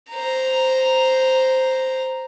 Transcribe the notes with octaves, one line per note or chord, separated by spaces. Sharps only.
C5 A#5